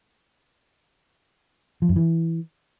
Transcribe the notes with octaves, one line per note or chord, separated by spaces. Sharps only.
F3
F#2
E3